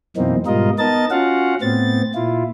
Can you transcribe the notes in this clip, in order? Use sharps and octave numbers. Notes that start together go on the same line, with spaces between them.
F#2 B2 E3 A#3 C4 D#4
G#2 B2 G3 F4 A#4 D#5
B3 D#4 A#4 D#5 A5 A6
C#4 F4 F#4 F5 F#5
A2 B3 C4 A6
A#2 E4 F4